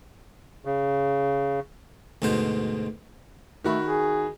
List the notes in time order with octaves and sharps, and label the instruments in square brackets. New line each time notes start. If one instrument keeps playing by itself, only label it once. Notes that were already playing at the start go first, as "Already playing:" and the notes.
[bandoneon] C#3
[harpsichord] D2 G#2 B2 C5
[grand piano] D#3 F#4 B5 [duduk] A3
[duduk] G#4